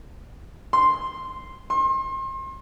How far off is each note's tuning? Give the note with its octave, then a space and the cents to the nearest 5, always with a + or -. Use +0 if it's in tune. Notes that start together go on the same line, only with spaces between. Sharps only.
C6 -5
C6 +35